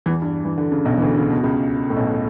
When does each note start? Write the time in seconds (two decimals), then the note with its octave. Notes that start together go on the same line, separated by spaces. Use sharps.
0.06 E2 E3
0.22 G2
0.45 E3
0.58 D3
0.72 C#3
0.85 B1 B2
0.98 E3
1.01 D2 D3
1.17 C#3
1.30 B2
1.43 C#2 C#3
1.90 A2
1.96 B1 B2